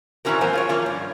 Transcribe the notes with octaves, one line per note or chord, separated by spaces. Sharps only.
A#2 E3 C4 C#4 F#4 A#4
F#2 A2 B3 A#4 C5 G#5
F4 G#4 C#5
F3 A#3 C#4 F4
G2